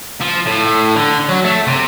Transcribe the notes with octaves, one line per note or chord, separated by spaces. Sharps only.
F3
A2
D3
F#3
A3
C3